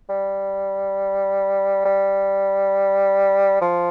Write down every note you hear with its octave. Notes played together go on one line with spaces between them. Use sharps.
G3
G3
F3